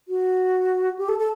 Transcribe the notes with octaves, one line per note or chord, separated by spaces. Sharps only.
F#4
G4
A4
A4